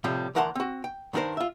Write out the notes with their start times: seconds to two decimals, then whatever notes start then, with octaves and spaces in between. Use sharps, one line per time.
0.04 A2 C3 F3 G3
0.35 D2 E3 A#4 F#5 A5 C6
0.55 C4 F#4
0.84 G5
1.13 G2 D#3 D4 D#4 A#4 C5
1.37 F4 E5